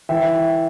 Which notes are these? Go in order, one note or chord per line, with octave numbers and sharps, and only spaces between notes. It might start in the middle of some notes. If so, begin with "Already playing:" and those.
E3 E5 G5